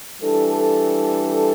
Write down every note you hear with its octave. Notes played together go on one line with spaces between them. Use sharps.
E3 G3 D4 A4